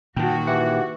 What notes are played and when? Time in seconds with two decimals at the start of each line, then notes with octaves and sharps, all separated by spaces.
0.16 A#2 D#3 F#4 G5 A5
0.47 E3 G4 F#5